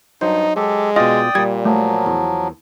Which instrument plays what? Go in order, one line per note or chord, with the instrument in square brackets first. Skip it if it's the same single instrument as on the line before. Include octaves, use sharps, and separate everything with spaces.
[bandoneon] G2 [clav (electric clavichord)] F#3 C5 [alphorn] D#4
[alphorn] G#3 [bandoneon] G4 A4
[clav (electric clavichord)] B2 F4 [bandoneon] D5 G5 D#6 [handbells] D#5
[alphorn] A#2 [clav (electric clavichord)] G3 [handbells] G#6
[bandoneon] F3 F#3 [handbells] A3
[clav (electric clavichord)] E2